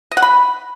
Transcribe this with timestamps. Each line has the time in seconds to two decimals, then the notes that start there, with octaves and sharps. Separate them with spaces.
0.11 D#5
0.17 F#5
0.22 B5